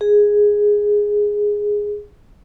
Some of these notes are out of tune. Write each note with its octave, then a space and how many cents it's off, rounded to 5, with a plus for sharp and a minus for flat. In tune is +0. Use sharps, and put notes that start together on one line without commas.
G#4 -5